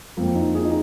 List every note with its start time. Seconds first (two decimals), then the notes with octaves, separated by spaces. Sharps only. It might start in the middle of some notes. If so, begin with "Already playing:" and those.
0.17 F2 F3 A#3 C4
0.35 D#4
0.55 G#4
0.65 D#4